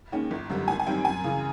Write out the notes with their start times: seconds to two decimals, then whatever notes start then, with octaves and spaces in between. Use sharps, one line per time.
0.12 D#2 D#3 G#3 C#4
0.31 G1
0.50 F#2 D3 G3
0.68 G#1 G#5
0.79 G#5
0.86 F#2 D#3 G3 C4 G5
1.05 F#2 G#5
1.24 C#3 E3